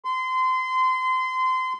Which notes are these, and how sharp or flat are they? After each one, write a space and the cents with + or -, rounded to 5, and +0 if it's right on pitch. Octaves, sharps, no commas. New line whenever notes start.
C6 -25